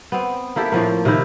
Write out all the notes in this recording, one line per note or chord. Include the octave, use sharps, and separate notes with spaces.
B3 C4
A#3 E4 G4 A4
A2 F3 A#3
C3 D#3 D#4 E4